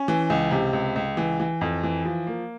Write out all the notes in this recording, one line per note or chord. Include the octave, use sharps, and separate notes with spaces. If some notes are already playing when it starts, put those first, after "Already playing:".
Already playing: C#4
E3
C#2
C3
C#2
C#2
E3
E3
F2
E3
F3
A#3